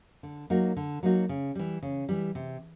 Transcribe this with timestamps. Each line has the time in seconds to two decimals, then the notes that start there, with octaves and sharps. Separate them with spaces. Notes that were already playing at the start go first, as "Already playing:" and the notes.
0.23 D3
0.50 F#3 A#3 D#4 F#4
0.77 D3
1.03 F#3 A#3 D#4 F#4
1.29 C#3
1.55 E3 G3
1.82 C#3
2.09 E3 G3
2.35 C3